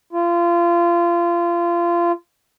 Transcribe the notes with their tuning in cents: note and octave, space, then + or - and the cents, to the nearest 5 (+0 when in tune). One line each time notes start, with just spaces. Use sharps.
F4 -25